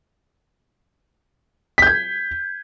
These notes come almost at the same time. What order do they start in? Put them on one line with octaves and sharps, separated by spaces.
B6 G6 G#6